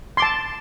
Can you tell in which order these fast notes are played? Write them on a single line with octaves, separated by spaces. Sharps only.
C6 D6 A5